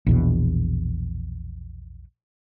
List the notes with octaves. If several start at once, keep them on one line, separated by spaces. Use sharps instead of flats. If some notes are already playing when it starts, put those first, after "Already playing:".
A#1 E2 B2